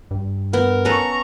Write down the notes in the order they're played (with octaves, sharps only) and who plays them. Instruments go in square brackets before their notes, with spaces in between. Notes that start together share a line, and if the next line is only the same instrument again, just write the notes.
[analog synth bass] G2
[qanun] B3 [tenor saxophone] A#4
[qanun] C#4 A4 B4 [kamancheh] A#5 C#6